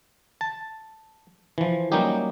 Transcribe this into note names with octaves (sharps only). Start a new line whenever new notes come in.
A5
E3 F3
F#3 G3 A#3 C#4 D#4 G4